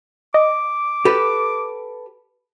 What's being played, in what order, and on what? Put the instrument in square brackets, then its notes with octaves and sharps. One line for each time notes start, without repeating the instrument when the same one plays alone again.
[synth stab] D#5 [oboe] D6
[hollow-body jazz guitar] G4 A4 B4